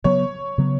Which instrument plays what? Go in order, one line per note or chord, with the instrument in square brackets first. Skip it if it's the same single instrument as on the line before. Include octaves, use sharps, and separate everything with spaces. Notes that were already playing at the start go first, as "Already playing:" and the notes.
[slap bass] C#3 F#3 B3 [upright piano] C#5
[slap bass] C#3 F#3 B3